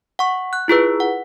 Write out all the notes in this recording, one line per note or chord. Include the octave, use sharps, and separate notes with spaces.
F#5 C#6
F#6
E4 F4 G#4 B4
F#5